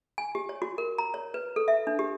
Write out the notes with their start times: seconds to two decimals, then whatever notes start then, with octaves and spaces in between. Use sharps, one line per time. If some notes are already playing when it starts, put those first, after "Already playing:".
0.18 G#5
0.35 G4
0.49 C#5
0.62 F#4
0.78 A#4
0.98 A#5
1.14 C#5
1.34 B4
1.56 A4
1.68 E5
1.87 D4
1.99 G4